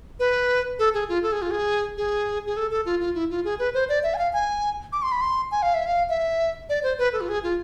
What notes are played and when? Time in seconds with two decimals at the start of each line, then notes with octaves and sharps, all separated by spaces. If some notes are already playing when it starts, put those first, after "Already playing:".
0.20 B4
0.79 A4
0.94 G#4
1.09 F4
1.23 A4
1.32 G#4
1.42 F4
1.51 G#4
1.97 G#4
2.47 G#4
2.57 A4
2.71 A4
2.86 F4
3.00 F4
3.15 E4
3.30 F4
3.45 G#4
3.59 B4
3.74 C5
3.89 D5
4.03 E5
4.14 G#5
4.18 F5
4.33 G#5
4.92 D6
5.03 C6
5.12 B5
5.21 C6
5.51 G#5
5.62 F5
5.74 E5
5.86 F5
6.09 E5
6.69 D5
6.83 C5
6.98 B4
7.13 A4
7.21 F4
7.29 G#4
7.43 F4